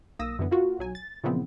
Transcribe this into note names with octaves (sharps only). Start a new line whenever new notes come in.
B1 A#3 D#6 E6 A#6
F#2 D3 E3 B3
A#3 F4 F#4
B1 F#3 G#5
A6
A#2 C#3 E3 F3 B3 C4